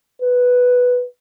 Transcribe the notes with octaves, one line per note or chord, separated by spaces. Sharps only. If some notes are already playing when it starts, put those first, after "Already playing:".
B4